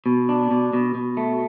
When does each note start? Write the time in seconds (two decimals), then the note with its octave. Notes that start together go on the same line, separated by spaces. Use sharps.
0.06 B2
0.29 D4
0.51 B2
0.73 B2
0.95 B2
1.17 A3